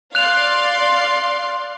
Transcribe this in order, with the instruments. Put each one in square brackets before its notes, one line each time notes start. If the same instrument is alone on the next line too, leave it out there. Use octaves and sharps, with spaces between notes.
[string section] D5 F5 C6 [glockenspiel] F#6 F7